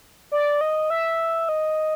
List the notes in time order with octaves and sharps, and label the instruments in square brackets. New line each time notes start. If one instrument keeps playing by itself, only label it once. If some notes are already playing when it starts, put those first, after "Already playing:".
[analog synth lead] D5
D#5
E5
D#5